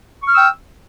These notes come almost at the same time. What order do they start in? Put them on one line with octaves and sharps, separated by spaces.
C#6 F6 E6 G5